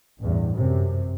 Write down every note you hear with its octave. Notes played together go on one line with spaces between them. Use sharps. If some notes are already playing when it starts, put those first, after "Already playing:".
A1 E2 G2
F#2 C3